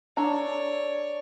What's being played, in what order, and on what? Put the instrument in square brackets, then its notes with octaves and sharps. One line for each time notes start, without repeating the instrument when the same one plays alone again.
[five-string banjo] D4 A4 A#5 [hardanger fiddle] C#5 D5